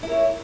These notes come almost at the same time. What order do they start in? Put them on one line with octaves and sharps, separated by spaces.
E4 A#4 C#5